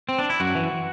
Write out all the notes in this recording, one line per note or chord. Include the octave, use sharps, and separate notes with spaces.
C4
D4
E4
F#2 F#4
E3